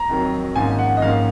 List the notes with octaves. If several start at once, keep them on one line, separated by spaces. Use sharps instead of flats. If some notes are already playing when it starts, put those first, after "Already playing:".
Already playing: A#5
F2 D#3 F#3
G#1 G#2 F3 A#3 C#4 G#5
F#5
D#5
G#1 G#2 F3 A#3 C#4 F5